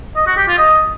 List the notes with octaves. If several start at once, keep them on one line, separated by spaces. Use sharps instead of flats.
D#5
F#4
G4
F4
D#5